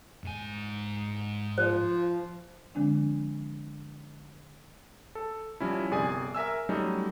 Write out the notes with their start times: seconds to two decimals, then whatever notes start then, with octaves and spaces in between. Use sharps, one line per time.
0.24 G#2 G#5
1.58 F3 C5
2.75 D3 F3 G#3 C4 D4
5.15 A4
5.60 F3 G3 C#4 E4
5.91 G1 C3 G#4 D5 G#5
6.35 A#4 E5 G#5 E6
6.69 F#3 G3 A3 C#4 D#4